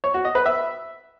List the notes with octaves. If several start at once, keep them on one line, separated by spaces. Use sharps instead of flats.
C#5
F#4
D#5
B4
E5